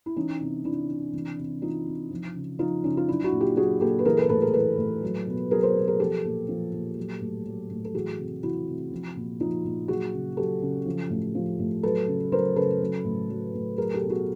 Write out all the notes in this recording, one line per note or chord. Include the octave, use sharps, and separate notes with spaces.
E4
E3 C#4 D#4
C3
E3 D4 E4
C3
E3
C3
E3 D#4 F4
C3
F3
C#3
F3 D#4 F4
C#3 C#4 D#4
F4
F#3 D4 E4
E4 F#4
A#2
F4 G4
F#3 F#4 G#4
A#2 G4 A4
B4
E3 G#4 A#4
A4 B4
A2 A4 B4
G#4 A#4
E3 A4 B4
A2
F#3
B2
F#3 G#4 A#4
A#4 C5
B2
G#4 A#4
F3 G4 A4
A#2
F3
A#2
F#3
A2
F#3
A2
A4
E3 F#4 G#4
C3
E3 E4 F#4
C3
F3
A#2
F3 D#4 F4
A#2
F#3 F#4 G#4
C#3
F#3 G4 A4
C#3
F3
A2
F3
A2
F#3 A4 B4
C#3
F#3 A#4 C5
C#3 A4 B4
F#3
A2
F#3
A2
F#3 G#4 A#4
G4 A4
B2
F#4 G#4